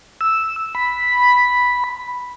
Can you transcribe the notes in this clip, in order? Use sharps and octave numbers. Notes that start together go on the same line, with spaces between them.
E6
B5